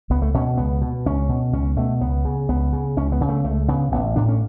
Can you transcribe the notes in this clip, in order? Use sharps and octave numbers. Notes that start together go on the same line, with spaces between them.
C#2 B3
A3
B2 C#4
C#2 B3
B2
C#2 C#4
B2
C#2 C#4
B2 A3
C#2 B3
C#3
C#2 B3
C#3
C#2 C#4
B3
C#3
A3
C#2 A3
C#3 B3
A1 B3
A2 D4
C#4